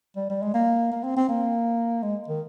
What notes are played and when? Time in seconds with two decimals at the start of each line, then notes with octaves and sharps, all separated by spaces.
0.16 G3
0.30 G3
0.42 G#3
0.54 A#3
0.92 A#3
1.04 C4
1.16 C4
1.29 A#3
2.03 G#3
2.28 D#3